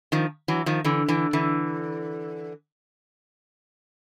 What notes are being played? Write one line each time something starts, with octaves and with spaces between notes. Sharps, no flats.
D#3 F3
E3 F#3
D#3 F3
D3 E3
D3 E3
D3 E3